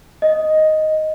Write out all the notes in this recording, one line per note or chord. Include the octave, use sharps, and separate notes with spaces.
D#5